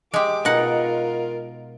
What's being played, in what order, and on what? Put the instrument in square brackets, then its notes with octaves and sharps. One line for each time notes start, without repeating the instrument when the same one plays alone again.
[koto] G#3 G4 [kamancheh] D6
[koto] B2 D#4 F#5 [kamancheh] F4 A#4